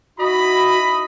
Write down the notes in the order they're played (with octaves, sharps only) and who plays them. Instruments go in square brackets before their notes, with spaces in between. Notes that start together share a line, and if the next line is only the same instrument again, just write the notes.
[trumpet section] D#4 E4 D#6 [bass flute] F#4 [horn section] D#5 B5